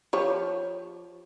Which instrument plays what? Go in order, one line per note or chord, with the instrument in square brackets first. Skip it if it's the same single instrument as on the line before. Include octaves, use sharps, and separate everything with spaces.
[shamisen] F3 G4 C#5